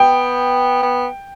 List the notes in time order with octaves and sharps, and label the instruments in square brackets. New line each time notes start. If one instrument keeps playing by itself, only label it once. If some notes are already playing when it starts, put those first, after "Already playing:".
Already playing: [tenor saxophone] B3 [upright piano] G5
[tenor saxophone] B3